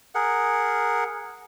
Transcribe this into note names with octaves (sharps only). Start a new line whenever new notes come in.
G#4 A#4 F#5